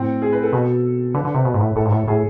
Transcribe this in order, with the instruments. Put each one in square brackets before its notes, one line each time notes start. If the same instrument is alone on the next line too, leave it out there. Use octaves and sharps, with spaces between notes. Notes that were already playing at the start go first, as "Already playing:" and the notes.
Already playing: [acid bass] A2 [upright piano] C4
[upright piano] G#4
B4
A4
[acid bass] B2
[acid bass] D3 [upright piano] B4
[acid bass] D3
C3
B2
G#2
A2
[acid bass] A2 [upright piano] A4
[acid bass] G#2
A2
[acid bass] A2 [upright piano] G#4